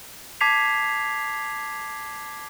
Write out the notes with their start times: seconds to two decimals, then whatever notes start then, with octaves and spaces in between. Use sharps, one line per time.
0.41 A5 D6 G#6 B6 C7 F7